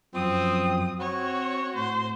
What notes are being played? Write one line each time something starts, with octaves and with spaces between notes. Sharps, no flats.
F#2 F3 C4 D#6
C4 F#4 C#5
A2 C5